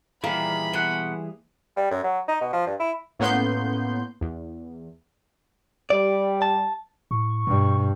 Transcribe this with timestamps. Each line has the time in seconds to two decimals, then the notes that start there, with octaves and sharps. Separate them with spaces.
0.24 A#2 D#3 E3 G3 A#3 G#4 B5
0.73 B2 F#5 C6
1.77 G3
1.91 F#2
2.04 F#3
2.28 D#4
2.41 B2
2.53 F3
2.67 G2
2.80 E4
3.19 A2 A#3 B3 C#4 C6 G6
4.21 E2
5.90 G3 D5
6.42 A5
7.11 A2 C#6
7.47 G2 B2